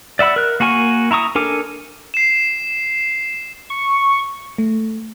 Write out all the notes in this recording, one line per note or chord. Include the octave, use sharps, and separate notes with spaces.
D5 E5 F#5 B5 E6
A#4 F#6
A#3 F#4 A#4 G#5 C#6
E4 A#5 C#6 D#6
D4 A4 A#4 G#5 D6
C7 E7
C#6
A3